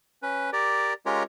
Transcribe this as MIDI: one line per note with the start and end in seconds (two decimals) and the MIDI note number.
0.22 0.50 61
0.22 0.50 71
0.53 0.93 67
0.53 0.93 70
0.53 0.93 74
1.06 1.23 56
1.06 1.23 61
1.06 1.23 65
1.06 1.23 67
1.06 1.23 70
1.06 1.23 73